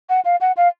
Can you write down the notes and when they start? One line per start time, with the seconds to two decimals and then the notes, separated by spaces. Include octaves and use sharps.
0.09 F#5
0.25 F5
0.41 F#5
0.57 F5